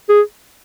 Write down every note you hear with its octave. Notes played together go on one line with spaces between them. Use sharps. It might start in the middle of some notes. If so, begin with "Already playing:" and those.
G#4